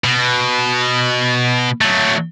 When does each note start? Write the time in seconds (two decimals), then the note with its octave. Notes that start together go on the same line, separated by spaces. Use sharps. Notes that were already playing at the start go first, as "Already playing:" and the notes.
0.04 B2
1.81 F#3 A3